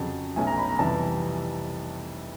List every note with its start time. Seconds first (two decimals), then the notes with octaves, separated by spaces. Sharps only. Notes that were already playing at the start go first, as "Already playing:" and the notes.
Already playing: F2 C#3 F#3 A5
0.36 B1 B2 F#3 A3 C#4 G#5
0.47 A#5
0.58 B5
0.69 A#5
0.79 F2 C3 E3 G3 A5